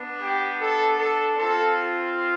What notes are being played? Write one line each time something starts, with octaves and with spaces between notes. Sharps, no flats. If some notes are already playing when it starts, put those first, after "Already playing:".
Already playing: B3 D4
G4
A4
A4
C4 F4 A4